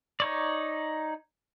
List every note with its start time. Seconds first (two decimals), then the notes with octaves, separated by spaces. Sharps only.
0.20 D#4 C#5 D5